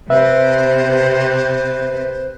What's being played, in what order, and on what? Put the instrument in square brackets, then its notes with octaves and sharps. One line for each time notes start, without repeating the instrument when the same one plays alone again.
[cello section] C3 [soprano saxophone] B4 [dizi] C5 [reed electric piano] E5